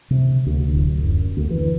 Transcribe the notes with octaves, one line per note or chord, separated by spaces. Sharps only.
C3
D2
D1
F#2
D2
E3